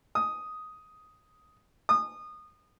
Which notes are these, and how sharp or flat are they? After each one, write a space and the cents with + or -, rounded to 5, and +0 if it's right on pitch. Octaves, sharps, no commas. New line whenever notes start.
D#6 +5
D#6 -25